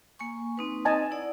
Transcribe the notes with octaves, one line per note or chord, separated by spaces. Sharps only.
A#3 G#5 C#6
C4 D#4 B4
D#5 G#5 A5
E4 D5 F#5